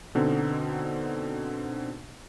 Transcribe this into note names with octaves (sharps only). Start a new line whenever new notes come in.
B2 D3 C4 D#4